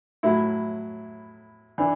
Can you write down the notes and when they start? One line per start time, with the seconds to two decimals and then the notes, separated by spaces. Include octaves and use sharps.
0.23 A2 F#3 E4
1.78 E3 D4